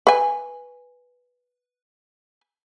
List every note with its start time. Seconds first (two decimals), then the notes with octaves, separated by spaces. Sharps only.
0.07 B4 G#5